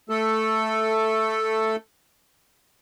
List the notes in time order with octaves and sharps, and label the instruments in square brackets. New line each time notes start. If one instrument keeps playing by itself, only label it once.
[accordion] A3 A4